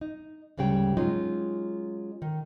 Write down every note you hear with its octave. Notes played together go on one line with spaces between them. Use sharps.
D#4
D2 G#2 C#3 G3 G5
F#3 G#3 C#4 D#4 F4 F#4
D#3